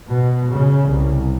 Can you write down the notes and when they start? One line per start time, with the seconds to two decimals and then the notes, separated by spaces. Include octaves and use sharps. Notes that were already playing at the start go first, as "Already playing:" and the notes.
0.10 B2
0.53 C#3
0.89 C2